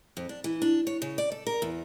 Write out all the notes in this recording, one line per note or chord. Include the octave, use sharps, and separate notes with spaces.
F2
D4
E3
D4
C#5
C#3
D5
A4
A#4
E2